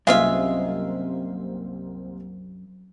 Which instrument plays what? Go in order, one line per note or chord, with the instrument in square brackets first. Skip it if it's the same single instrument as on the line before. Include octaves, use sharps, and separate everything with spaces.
[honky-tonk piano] C2 A#3 C4 [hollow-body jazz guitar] F#2 [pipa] G#3 F4 E5 [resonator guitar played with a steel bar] F5